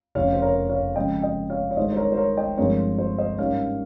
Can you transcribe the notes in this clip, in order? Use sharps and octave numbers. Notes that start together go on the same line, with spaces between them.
F1 F2 C#3 C#5 F5
C5
A#4 C#5
C#5 F5
F2 C#3 G#3 D#5 G5
D#5 G5
C#5 F5
C#5
G2 D#3 G#3 C5 D#5
C5
A#4 C#5
C5
A#4 C#5
D#5 G5
G1 G2 F3 G#3 C4 A#4 C#5
C5
C5 D#5
G#2 G3 A#3 C#4 C#5 F5